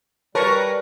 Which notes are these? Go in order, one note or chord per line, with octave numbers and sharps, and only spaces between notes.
G3 A#4 B4 C#5 A5 C#6